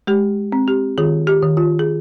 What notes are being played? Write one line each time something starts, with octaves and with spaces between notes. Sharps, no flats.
G#3 G4
C4
G4
D#3 F4 G#4
G4
D#3
F4
G#4